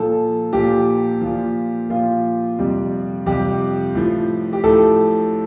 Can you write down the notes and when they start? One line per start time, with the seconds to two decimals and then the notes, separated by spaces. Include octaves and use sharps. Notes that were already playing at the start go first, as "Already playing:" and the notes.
Already playing: A#2 F3 A4
0.52 A#2 F3 G4
1.21 A#2 F3
1.90 A#2 F3 F4
2.58 F2 C3 G3
3.26 F2 C3 G3 G4
3.95 A2 F3
4.53 G4
4.64 A2 F3 A4